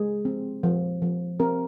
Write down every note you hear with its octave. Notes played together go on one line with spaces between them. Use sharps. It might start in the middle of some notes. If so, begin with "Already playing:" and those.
Already playing: G#3 G#4
C4
F3
F3
C4 A#4